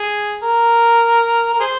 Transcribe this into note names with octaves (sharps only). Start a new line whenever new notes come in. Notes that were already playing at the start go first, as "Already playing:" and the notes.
Already playing: G#4
A#4
A#4
G#4 C5